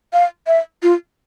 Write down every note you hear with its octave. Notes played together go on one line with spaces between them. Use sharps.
F5
E5
F4